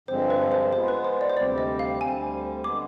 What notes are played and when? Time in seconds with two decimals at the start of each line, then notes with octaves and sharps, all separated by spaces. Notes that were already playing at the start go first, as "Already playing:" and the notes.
0.08 G2 D3 F3 G#3 C4 C5
0.30 B4
0.52 C5
0.73 G#3 B3 F4 C5
0.88 B4
1.05 C5
1.21 D5
1.30 C5
1.37 D2 C3 G3 C4 G4 D5
1.58 D#5
1.79 F5
2.01 D2 D3 G3 C4 G#5
2.64 D3 G#3 B3 D6